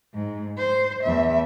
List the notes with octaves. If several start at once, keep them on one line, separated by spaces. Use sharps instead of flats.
G#2
C5
E2 E5